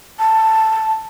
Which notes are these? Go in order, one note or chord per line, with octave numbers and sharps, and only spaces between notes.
A5